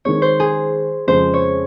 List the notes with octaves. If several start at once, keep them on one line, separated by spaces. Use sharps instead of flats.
D#3 G#3 C4 C#5
C5
G#4
F2 C#3 G#3 C5
C#5